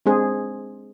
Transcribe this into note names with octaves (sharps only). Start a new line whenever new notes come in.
G#3 C4 D4 G#4 C5